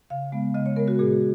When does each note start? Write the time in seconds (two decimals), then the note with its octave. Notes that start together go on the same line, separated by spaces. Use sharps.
0.10 C#3 F5
0.32 G#3 B3
0.54 C#3 D#5
0.66 C#5
0.76 G#3 B3 A#4
0.88 F#4
0.99 A#2 G#4